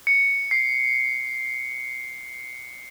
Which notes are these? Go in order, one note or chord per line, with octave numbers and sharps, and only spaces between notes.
C#7
C7